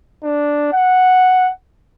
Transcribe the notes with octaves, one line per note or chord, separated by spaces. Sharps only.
D4
F#5